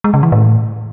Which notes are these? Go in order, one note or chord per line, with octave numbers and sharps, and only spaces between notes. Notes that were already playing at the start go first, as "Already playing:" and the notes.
G#3
C#3
E3
A2